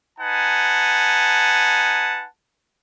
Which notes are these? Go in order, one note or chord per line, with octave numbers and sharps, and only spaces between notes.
D#4 B4 F#5 G#5 A5